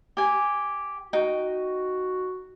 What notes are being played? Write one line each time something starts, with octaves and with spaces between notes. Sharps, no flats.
G4 G#5
D#4 F#4 G5